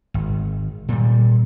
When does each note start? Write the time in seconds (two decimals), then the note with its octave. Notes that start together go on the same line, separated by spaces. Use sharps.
0.14 G#1
0.89 A#2 G3